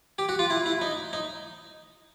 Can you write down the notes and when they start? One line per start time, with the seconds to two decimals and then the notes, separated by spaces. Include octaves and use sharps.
0.19 G4
0.29 F#4
0.39 F4
0.50 E4
0.66 E4
0.81 D#4
1.13 D#4